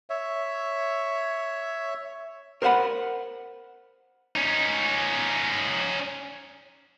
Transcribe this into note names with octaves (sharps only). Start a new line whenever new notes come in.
C#5 E5
A#4 C5 D#5 F#5 B5
C#4 D#4